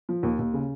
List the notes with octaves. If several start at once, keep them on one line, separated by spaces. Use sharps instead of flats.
F3
D#2
D#2
C#3